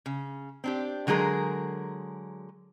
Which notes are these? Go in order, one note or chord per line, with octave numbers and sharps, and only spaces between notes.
C#3
C4 D4 G4
D3 F#3 G#3 G#4 A#4